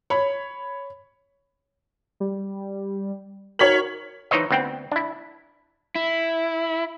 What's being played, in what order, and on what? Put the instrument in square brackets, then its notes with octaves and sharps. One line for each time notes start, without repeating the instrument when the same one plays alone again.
[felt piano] C#5 B5
[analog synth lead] G3
[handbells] D#4 F#4 A#4 [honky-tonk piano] C#5 B6 F#7 [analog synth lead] G#6
[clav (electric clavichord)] E3 D#4 C5 C#5 D#5
D2 B3 C4 G5
D4 E4
[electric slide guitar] E4